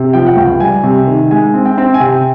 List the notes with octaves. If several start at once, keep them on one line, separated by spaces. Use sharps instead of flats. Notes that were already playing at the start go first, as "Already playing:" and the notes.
Already playing: C3
F3 G5
F#5
C#2 G5
G3 G#5
C3
D#3
G#3 G#5
C4
G5
C4
G#5
C3 G5